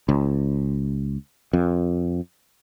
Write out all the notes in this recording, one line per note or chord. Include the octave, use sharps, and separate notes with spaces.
C#2
F2